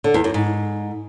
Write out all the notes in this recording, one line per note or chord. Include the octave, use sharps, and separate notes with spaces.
D3
E2
F#2
G#2